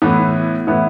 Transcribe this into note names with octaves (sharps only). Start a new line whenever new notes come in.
A2 E3 B3 E4
A2 E3 B3 E4